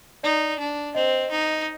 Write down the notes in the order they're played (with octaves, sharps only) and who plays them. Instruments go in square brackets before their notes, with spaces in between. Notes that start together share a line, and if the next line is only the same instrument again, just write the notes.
[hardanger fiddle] D#4 [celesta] D5
[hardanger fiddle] D4
[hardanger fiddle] C4 [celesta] D#5
[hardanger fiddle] D#4